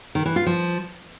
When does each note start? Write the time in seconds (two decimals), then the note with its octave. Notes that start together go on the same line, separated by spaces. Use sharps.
0.15 D#3
0.26 E3
0.36 F4
0.46 F3